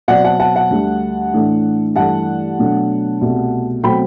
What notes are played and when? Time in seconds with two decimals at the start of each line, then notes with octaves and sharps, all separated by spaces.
0.08 B2 F#3 C4 D5 F#5
0.24 F#5 A5
0.40 F#5 A5
0.55 F#5 A5
0.70 D2 D3 G3
1.33 A2 E3 A3 D4
1.96 G2 E3 A3 F#5 A5
2.59 B2 F#3 A3 D4
3.21 C2 B2 A3
3.83 B2 F#3 A3 C4 G5 B5